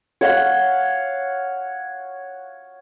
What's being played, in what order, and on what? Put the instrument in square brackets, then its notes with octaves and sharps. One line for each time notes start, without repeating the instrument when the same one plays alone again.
[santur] C#5 F5 F#5